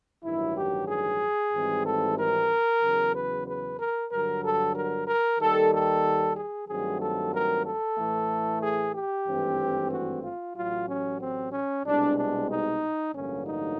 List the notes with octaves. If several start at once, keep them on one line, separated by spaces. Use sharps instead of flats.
A1 G2 D#3 F#3 E4
G4
G#4
G#1 G#2 E3 G3 C4
A4
A#4
E2 C#3 F#3
B4
B4
A#4
G2 D3 F#3 A#4
A4
A#4
A#4
D#2 D#3 G3 A4
A4
G#4
G2 D#3 F#3 A3 C4 G#4
A4
A#4
A4
A2 E3 A3
G#4
G4
G#1 G2 E3 A3 C4
F#4
F4
A1 A2 F#3 F4
C#4
C4
C#4
C2 B2 G#3 D4
D4
D#4
A1 G2 D3 F#3 A#3 C#4
D#4